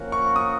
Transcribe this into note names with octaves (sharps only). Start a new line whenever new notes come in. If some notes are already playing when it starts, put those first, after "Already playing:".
Already playing: F3 A#3 C#4 F#4 A#4
C#6
D#6